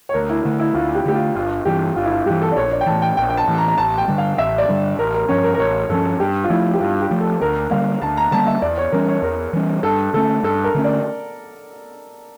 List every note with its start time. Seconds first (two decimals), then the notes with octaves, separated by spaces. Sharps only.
0.09 C#5
0.14 D2 A#4
0.29 E4
0.45 D3 A3
0.60 E4
0.75 D2 F4
0.95 G4
1.06 D3 A3 G4
1.15 F4
1.35 G1 F4
1.65 G2 E3 G4
1.96 G1 F4
2.05 E4
2.11 F4
2.26 G2 E3 G4
2.42 A4
2.52 D5
2.56 A#1 C#5
2.72 D5
2.81 G5
2.86 A2 E3 A5
3.02 G5
3.17 A#1 G5
3.30 G5
3.37 A5
3.48 A2 E3
3.58 A#5
3.68 A#5
3.78 A1 A5
3.98 G5
4.08 G2 D3 G3
4.18 F5
4.38 A1 E5
4.58 D5
4.69 G2 D3 G3
4.99 A1 A#4
5.14 A#4
5.29 G2 F3 C#4 C#5
5.44 A#4
5.54 A#4
5.59 A1 C#5
5.89 G2 F3 C#4 A4
6.20 G2 G4
6.44 F4
6.50 F3 A3 E4
6.74 G4
6.80 G2 F4
7.01 G4
7.11 F3 A3
7.21 A4
7.41 D2 A#4
7.71 D3 G3 A#3 F5
8.02 D2 A5
8.17 A#5
8.31 D3 G3 A#3 A5
8.47 E5
8.62 E2 D5
8.78 C#5
8.92 E3 G3 C#4 A#4
9.08 C#5
9.22 E2 A#4
9.53 E3 G3 C#4
9.83 G2 A4
10.14 D3 A3 C#4 A4
10.43 G2 A4
10.64 A#4
10.75 D3 A3 C#4
10.84 D5